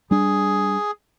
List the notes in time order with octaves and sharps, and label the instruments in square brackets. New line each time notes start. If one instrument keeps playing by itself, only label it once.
[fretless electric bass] G3 D4 [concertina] G#4